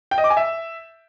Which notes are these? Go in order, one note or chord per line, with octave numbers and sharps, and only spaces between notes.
G5
D#5
D6
G#5
E5